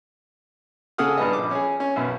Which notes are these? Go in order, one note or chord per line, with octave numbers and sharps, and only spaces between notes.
C#3 G#4 A4 F#5 D#6 F6
G2 G3 B3 D#5
A#1 D6
C#4 G#4
C#4
B1 F#2